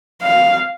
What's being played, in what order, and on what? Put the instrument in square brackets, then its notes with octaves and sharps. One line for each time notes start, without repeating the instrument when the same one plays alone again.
[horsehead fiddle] F5